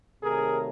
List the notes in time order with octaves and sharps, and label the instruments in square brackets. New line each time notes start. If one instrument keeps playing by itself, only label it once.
[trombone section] C3 D#3 F#3 A3 G#4 A#4